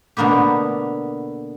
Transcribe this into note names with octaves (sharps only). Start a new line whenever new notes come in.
B2 D3 A#3 B3 G4